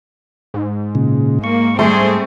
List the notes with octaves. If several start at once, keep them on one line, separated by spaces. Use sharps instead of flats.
G#2
A#2 C#3
A#3 C#6
G3 A3 C4 G#4 C6